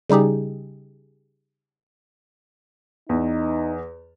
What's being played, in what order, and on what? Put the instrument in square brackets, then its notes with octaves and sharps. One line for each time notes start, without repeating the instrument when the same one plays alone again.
[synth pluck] C#3 G3 D#4 G4 G#4
[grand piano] E2 [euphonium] D#4